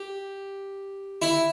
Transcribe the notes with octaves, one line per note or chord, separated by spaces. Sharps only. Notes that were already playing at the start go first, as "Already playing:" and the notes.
Already playing: G4
E4